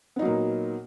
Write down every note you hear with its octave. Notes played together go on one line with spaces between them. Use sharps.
A#2 F#3 A#3 B3 D#4